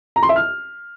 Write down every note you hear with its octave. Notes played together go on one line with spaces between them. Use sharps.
A#5
C6
E5
F6